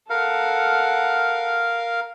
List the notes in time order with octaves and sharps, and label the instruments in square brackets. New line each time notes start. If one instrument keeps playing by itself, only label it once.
[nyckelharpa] A4 F#5 [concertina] A#4 F5